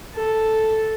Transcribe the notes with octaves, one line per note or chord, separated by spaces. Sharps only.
A4